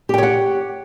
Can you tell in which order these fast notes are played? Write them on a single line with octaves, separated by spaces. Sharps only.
G4 G5 C#5 F#5